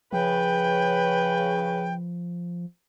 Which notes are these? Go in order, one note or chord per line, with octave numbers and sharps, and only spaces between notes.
C#3 F3 B4 G5